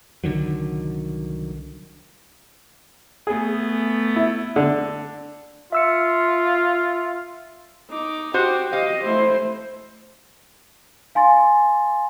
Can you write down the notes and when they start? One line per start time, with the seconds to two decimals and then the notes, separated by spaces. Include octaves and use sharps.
0.24 C2 D3 D#3 F#3
3.27 A3 B3 G#4
4.16 E4
4.56 D3
5.72 F4 E5 E6 C#7
7.89 D#4 D6
8.34 F#4 G4 C5
8.73 G4 D#5 F5
9.04 A3 E4 C5
11.15 F5 G#5 C6 A6